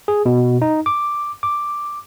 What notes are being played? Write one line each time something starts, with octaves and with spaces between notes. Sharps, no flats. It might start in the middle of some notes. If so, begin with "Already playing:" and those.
G#4
B2
D#4
D6
D6